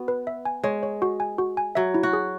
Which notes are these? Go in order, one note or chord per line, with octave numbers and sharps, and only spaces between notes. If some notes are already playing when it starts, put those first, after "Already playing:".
Already playing: B3 F#4
B4
E5
G#5
G#3 C#5
C#5
F#4
G#5
F#4
G#5
F#3 E5
E4
F#4
G#4